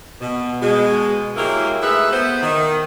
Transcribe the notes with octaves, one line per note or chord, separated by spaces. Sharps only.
B2
B2 G#3
F#3 G#3 A#3 E4 G4 A#4
G#3 A3 D#4 B4 E5
B3 C5
D#3